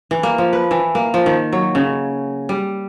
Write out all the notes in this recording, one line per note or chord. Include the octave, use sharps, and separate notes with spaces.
E3
A#3
F3
B4
E3
A#3
F3
D#3
F#3
C#3
G3